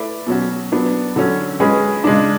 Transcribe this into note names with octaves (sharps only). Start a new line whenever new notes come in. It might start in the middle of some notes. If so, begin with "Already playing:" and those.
Already playing: A3 E4 B4 D5
B2 F#3 C#4 F#4
F#3 B3 D4
D3 F#3 C#4
G#3 C#4 G#4 B4
C#3 G#3 D4